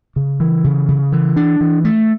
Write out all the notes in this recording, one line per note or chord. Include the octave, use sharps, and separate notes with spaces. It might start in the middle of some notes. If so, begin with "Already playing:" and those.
C#3
E3
C#3
C#3
E3
D4
E3
A3